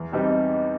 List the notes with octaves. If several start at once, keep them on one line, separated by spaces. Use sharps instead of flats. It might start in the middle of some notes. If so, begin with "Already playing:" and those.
Already playing: E2
B2 G3 C4 D#4